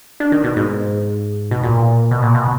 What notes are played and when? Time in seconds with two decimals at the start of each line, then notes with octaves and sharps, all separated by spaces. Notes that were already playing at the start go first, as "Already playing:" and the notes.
0.20 D4
0.32 D#3
0.44 B2
0.56 G#2
1.51 B2
1.63 A#2
2.11 B2
2.22 A#2
2.35 B2